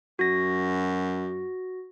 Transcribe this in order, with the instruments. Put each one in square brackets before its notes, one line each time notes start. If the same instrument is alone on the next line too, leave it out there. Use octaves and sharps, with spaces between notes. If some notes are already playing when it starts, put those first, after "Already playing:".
[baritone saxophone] F#2 [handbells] F#4 A#6